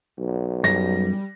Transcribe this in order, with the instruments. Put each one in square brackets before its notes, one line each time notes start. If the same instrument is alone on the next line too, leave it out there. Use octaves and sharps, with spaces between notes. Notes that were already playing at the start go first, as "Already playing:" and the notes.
[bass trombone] B1
[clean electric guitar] F#2 [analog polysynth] G3 [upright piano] A#6